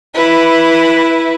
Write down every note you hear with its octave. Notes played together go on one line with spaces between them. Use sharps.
E4 B4